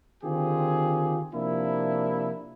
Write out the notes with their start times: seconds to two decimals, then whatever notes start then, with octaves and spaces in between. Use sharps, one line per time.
0.24 D3 D#3 C4 F4 G4 G#4
1.35 C3 F3 A#3 D4 E4